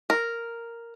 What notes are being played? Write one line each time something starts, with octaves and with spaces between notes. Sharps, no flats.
A#4